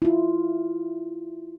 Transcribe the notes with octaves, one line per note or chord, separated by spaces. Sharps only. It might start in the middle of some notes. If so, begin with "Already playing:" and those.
E4 F4